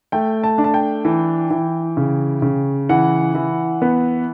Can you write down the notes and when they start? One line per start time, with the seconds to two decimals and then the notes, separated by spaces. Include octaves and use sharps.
0.12 A3 G5
0.44 A5
0.58 D4
0.64 A5
0.74 G5
1.05 E3
1.51 E3
1.97 C#3
2.42 C#3
2.89 E3 F#5
3.35 E3
3.82 B3